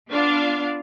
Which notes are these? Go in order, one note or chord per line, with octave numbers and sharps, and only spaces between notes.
B3 D4 F4 D5 F5